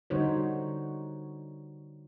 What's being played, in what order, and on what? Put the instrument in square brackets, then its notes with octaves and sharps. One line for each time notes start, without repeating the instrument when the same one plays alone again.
[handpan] D3 G3 D#4 F#4 C5 C#5